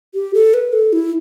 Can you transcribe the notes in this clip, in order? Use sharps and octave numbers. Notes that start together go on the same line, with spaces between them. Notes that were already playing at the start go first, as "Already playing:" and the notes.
G4
A4
B4
A4
E4